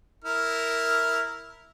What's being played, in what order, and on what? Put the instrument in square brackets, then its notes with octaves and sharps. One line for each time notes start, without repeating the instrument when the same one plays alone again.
[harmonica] E4 A#4 F6